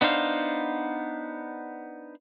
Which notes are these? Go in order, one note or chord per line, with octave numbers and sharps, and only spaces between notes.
B3 D4 D#4 C5 F5